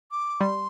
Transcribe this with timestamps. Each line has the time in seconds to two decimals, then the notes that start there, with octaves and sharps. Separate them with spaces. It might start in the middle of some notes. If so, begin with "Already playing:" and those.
0.12 D6
0.40 G3 C6